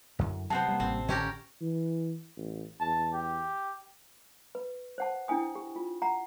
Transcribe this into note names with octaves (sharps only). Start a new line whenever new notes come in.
F#2 D3 E4
C3 F#3 B3 C5 A5
G3 A#3
A1 C4
D3 C#4 G4 A#4
E3
A1
E2 A5
G4
B4
C5 F#5 A5
D4 E4 G5 G#5 D#6
G4
F4
F#5 A#5